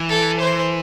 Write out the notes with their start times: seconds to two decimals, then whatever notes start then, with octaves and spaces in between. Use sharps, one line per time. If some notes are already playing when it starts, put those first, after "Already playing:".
Already playing: E3
0.09 A4
0.40 C5